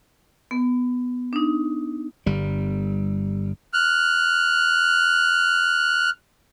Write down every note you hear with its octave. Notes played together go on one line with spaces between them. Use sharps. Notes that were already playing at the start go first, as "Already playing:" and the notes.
B3
D4 D#4
G1 G3
F6 F#6